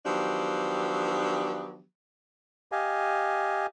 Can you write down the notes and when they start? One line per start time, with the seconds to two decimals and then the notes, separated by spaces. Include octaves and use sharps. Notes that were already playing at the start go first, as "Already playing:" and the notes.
0.06 D#3 F3 F#3 B3 D4 G4
2.72 G4 D#5 F5 G#5